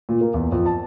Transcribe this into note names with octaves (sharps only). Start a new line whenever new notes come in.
A#2
A#3
E2
F2
A5